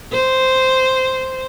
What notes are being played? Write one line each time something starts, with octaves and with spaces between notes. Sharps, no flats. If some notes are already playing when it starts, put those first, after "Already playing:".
C5